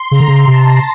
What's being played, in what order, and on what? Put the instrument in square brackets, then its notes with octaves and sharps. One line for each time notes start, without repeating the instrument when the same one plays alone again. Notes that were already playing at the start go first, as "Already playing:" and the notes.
Already playing: [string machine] C6
[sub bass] C#3 [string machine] A#5
[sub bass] D3
C#3
[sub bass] C3 [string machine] A5